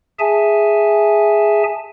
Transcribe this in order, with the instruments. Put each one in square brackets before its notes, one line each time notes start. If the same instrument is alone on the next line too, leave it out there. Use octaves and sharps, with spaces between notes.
[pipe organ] G#4 E5 G#5 A5